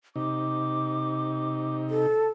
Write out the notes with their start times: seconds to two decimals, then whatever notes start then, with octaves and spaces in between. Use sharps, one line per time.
0.16 C3 D#4 D6
1.90 A4